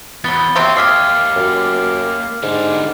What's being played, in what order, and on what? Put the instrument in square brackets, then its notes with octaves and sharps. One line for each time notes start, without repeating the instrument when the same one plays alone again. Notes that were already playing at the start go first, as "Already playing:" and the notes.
[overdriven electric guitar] E2 [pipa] F#3 B3 [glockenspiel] A6 G7
[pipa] C3 F#3 C4 [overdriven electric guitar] A#3 G4
[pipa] G#3 E5 G#5 [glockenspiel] D6 F6 C7
[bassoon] F#2
[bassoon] G#2 [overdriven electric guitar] D3 G3